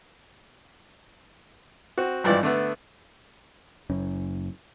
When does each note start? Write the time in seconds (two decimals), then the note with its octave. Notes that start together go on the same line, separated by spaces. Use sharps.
1.98 C4 F#4
2.24 G#1 G2 E3 F3 D5
2.43 D3 A3 B3
3.90 F#1 F#2 C#4